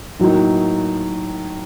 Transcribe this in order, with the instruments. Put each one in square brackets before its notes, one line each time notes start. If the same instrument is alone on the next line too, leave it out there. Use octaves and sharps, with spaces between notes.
[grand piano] A2 F#3 A#3 D#4